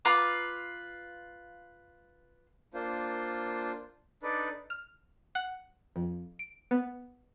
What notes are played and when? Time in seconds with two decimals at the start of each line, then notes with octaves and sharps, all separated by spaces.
0.05 F4 B4 A#5 D6
2.74 A#3 D4 F4 C5
4.23 D4 D#4 A4 B4 D5
4.70 F6
5.35 F#5
5.96 F2
6.39 D7
6.71 B3